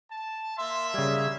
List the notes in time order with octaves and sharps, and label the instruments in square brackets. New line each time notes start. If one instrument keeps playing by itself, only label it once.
[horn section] A5
[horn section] A#3 E5 [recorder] C6
[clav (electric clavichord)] C#3 G3 [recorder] G#6